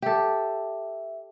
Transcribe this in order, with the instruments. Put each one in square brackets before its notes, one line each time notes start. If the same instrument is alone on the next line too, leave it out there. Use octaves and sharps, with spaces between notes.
[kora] G4 A4 [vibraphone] E5